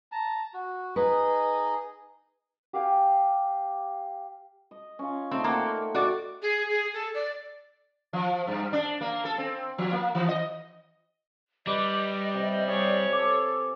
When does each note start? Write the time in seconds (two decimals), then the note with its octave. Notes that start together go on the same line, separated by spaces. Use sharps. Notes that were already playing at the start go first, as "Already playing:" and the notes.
0.12 A5 A#5
0.54 F#4
0.96 D#4 G#4 B4 D#5
2.73 G4 F5 G5 G#5
4.71 D#5
4.99 C#4 F4
5.31 A3 C4 D#4 D5
5.44 A#3 C5 F#5 G5
5.94 F#4 D5
6.42 G#4
6.69 G#4
6.94 A4
7.14 D5
8.13 F3
8.47 G2
8.73 D4
9.01 A#3
9.25 A4
9.38 C4
9.78 F3
9.92 A#3
10.15 E3
10.28 D#5
11.67 G3 B4 D#5 D6
12.34 C3 E5
12.68 G#4 C#5 D5
13.12 A4 D6